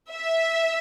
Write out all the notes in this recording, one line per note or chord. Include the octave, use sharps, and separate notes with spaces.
E5